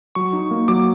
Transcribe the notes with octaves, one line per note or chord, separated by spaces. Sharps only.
F#3 C#6
D#4
A#3
F#3 D6